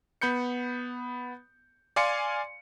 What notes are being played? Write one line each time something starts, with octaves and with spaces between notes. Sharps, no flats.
B3 B5 G6 C#7
D5 F5 G#5 C6 C#7